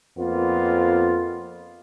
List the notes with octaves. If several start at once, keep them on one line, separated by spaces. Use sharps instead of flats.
F2 A#3 B3 F4